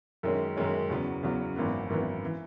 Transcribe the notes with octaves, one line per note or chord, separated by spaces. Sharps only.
F#2 D#3 G#3 C#4
F#2 D#3 G#3 C#4
E2 C#3 F#3 B3
E2 C#3 F#3 B3
G#1 F#2 E3 B3
G#1 F#2 E3 B3
E3